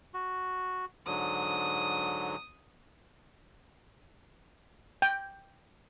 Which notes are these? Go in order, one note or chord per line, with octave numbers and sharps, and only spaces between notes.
F#4
G#2 D3 F#3 D#6
G5